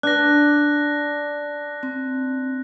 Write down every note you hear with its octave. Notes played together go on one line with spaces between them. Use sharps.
D4 F#6 A#6
C4